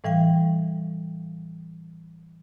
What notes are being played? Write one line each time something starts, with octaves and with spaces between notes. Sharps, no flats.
A2 E3 G3 F5 G5